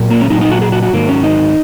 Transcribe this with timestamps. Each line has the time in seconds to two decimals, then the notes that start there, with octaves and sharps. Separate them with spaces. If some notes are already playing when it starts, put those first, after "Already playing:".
Already playing: A#2 F#3
0.11 A#3
0.21 C#4
0.30 A#2 F#3 D#4
0.41 D#4
0.51 F#4
0.62 G#4
0.72 F#4
0.83 F#4
0.92 G#2 D#3 F#3 A#3
1.09 C#4
1.24 D#4